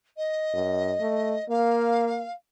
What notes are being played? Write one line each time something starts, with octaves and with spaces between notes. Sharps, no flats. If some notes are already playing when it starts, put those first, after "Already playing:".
D#5
F#2
A3
A#3 F5